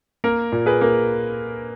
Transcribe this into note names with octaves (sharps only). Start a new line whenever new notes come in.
A#3 A#4
A#2
G#4 B4
A#3